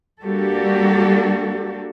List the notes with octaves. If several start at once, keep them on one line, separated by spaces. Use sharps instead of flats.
G3 A#3 D4 F#4 G4 A4